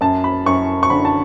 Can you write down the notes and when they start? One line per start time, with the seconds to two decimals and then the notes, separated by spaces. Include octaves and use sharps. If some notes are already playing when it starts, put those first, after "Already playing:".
0.01 F#2 A5
0.24 B5
0.46 F#2 C#6
0.83 C#6
0.90 D3 B5
1.05 A5